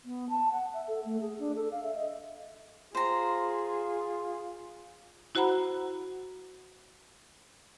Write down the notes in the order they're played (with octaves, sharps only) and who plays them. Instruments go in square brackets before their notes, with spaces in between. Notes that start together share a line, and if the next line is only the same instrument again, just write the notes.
[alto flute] B3
A5
F#5
E5
A4
A3
G#4
D4
A4
F5
E5
D#5
[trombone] F4 [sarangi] G#4 [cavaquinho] C5 A#5
[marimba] E4 F#4 C5 F#5 A#5 B5